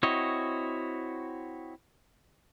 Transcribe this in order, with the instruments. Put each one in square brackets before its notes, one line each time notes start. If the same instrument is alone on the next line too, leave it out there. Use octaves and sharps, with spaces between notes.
[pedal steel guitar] C4 E4 F#4 C#5 D#5